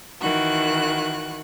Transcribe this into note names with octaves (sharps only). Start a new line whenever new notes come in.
D#3 E3 F#4 F#6